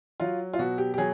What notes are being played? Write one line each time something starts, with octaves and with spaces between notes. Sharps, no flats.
F#3 F4
F4
B2 F#4
G4
G4
F#3 G#4